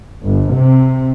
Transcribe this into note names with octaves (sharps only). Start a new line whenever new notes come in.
G1
C3